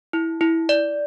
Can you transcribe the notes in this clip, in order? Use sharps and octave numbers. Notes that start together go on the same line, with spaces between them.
E4
E4
D5